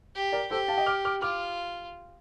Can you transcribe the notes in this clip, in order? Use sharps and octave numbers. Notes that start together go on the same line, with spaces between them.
G4
A#4 D5
G4 A4 C5
F5 A5
D#5 G5
D6 F6
D6 F6
F4 D6 F6